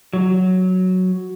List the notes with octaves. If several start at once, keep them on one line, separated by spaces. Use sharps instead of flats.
F#3